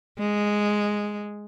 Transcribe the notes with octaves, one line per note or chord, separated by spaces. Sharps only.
G#3